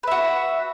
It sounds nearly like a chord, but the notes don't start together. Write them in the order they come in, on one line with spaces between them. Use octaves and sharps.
B4 E5 F#4